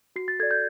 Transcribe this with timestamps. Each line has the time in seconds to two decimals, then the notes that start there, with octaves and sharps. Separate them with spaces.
0.16 F#4 C7
0.28 A6
0.40 A4 D5 G#6
0.51 G6